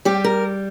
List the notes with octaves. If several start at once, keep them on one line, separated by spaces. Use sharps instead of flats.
G3 G4
A#4